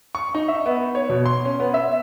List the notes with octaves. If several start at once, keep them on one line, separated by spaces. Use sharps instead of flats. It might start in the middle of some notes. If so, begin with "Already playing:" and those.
C#6
D#4
E5
B3
C#5
B2
C6
C#4
B3
E5